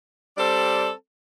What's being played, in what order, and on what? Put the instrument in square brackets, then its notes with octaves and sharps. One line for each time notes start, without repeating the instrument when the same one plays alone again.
[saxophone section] G3 C4 A4 D5